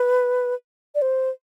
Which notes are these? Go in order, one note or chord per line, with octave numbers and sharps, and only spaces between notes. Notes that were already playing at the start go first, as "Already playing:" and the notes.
Already playing: B4
D5
C5